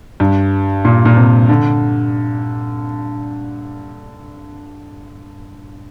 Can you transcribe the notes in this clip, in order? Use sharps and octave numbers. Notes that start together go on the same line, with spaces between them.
G2
A#2
A#2
C3
D3